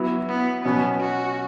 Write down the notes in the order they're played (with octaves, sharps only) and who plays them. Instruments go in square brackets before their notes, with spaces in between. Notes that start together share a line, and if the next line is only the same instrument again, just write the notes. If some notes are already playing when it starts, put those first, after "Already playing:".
Already playing: [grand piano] F#3 B3 E4
[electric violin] B3
[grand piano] B2 F#3 C#4 [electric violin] B3
[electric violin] F#4